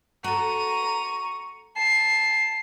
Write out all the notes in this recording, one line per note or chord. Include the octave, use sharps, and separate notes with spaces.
F#4 A4 A#5 C#6 D#7
A5 C7